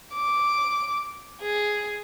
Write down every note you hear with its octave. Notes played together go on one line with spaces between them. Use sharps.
D6
G#4